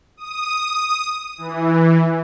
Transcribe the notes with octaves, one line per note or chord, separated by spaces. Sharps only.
D#6
E3